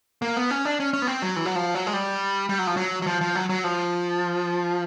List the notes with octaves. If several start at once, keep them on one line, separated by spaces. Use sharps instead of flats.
A#3
B3
C#4
D4
C#4
C#4
B3
C4
F#3
E3
F#3
F3
F#3
G#3
G3
G3
F#3
F3
F#3
F#3
F3
F3
F#3
F#3
F3